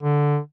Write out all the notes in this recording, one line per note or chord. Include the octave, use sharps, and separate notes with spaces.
D3